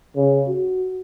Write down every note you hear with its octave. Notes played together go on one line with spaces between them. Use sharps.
C#3
F#4